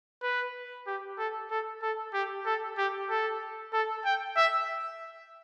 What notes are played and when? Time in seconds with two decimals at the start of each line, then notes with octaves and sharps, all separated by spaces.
0.23 B4
0.87 G4
1.18 A4
1.50 A4
1.82 A4
2.14 G4
2.46 A4
2.78 G4
3.10 A4
3.73 A4
4.05 G5
4.37 E5